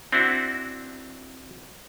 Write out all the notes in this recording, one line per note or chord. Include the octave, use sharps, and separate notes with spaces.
C4 D4 E4 F#4